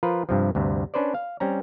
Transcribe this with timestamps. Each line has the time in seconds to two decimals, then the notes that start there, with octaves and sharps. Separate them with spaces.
0.03 F3 F4 A#4 B4
0.29 G2 C3 F3
0.55 D2 G2 C3
0.94 C#4 D4 B4 C5 D5
1.14 F5
1.40 G3 C4 C#4 A#5